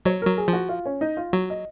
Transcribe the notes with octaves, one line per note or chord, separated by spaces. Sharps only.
F#3 C#5
A#4
F#3
G#4
F3
F#4
F4
C#4
D#4
F4
F#3 F#4
D#5